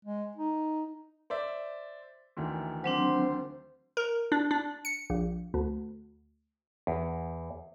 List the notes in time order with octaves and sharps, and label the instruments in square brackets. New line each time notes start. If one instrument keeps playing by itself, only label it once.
[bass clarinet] G#3
D#4
[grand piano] C5 D5 E5
D2 D#3 E3
[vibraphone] F#3 C4 D4 [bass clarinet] C5
[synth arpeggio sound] A#4
D4
D4
C#7
A#1
D2
[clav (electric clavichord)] E2